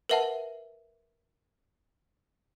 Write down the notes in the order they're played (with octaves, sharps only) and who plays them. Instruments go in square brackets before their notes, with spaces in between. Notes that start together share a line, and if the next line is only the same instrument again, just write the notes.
[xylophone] A#4 B4 E5 F#5 A5